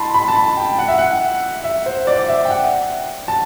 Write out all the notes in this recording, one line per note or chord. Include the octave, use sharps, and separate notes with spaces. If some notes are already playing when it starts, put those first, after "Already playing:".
Already playing: A5 B5 C6
B5
A5
B5
G5
F#5
E5
F#5
E5
C5
D5
D5
E5
G5
F#5
A5